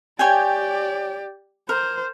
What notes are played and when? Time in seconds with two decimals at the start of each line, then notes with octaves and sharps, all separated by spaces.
0.19 G4 C#5 D5 G5 G#5
1.69 A#4 C5